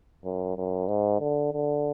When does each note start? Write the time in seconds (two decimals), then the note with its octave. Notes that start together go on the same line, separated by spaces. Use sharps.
0.24 F#2
0.57 F#2
0.88 G#2
1.20 D3
1.53 D3